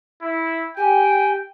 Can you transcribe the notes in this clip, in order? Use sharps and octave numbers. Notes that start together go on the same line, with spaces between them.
E4
G4 G5 G#5